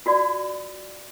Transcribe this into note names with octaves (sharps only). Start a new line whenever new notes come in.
F4 F#4 D5